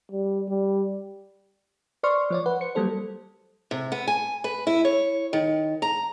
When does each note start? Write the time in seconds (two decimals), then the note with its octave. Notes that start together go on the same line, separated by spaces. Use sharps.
0.12 G3
0.50 G3
2.03 B4 C5 D5 C6 C#6 F6
2.30 F3 C#5 D5
2.46 B4 F#5
2.61 C5 C#7
2.75 F#3 G3 A#3 A4 C5
3.71 C3
3.92 B3
4.07 G#5
4.44 B4
4.67 E4
4.85 C#5
5.33 D#3
5.82 A#5